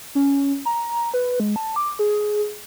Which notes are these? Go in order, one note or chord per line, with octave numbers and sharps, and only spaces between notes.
C#4
A#5
B4
G#3
A5
D6
G#4